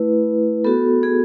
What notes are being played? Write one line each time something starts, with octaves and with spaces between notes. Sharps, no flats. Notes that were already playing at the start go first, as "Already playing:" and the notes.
Already playing: A3 E4 B4
B3 F#4 A4
G#4